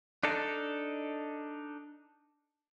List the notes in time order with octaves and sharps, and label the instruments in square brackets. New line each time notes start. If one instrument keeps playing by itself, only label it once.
[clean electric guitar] D4 D#4 A4